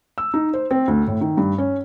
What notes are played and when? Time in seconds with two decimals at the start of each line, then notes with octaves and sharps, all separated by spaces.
0.18 E6
0.34 D#4
0.54 C5
0.71 C4
0.88 D2
1.08 A2
1.21 D#3
1.37 G2
1.58 C#4